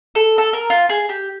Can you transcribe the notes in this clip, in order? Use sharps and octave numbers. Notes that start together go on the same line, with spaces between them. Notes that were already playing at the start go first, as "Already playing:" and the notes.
A4
A4
A#4
F4
G#4
G4